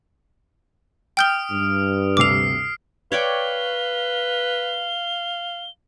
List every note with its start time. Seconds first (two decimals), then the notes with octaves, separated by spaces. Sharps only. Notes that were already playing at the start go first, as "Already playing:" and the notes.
1.17 G5 D#6 F6 G6 D7 G7
1.51 G2
2.17 D2 C3 D6 E6 F6 C7 F7
3.12 B4 C#5 D5 F5 G5 G7